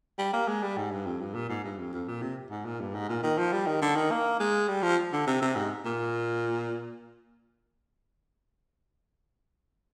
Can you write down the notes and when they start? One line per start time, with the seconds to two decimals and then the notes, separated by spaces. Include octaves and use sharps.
0.19 G3
0.33 A#3
0.48 G#3
0.63 G3
0.77 G#2
0.91 G2
1.06 F2
1.21 G2
1.35 A#2
1.49 G#2
1.64 G2
1.78 F2
1.93 F2
2.08 A#2
2.22 C3
2.51 G#2
2.65 A#2
2.81 G2
2.95 G#2
3.10 A#2
3.23 D#3
3.38 F3
3.53 G3
3.67 D#3
3.82 D3
3.96 D#3
4.11 A#3
4.40 G#3
4.68 G3
4.83 F3
5.13 D3
5.27 C3
5.42 C3
5.56 G#2
5.85 A#2